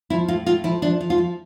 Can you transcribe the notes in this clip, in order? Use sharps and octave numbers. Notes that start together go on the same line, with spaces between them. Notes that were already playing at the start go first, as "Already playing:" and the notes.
F3 E4
A2 F4
A2 F4
F3 E4
F3 D4
F3
F4
F3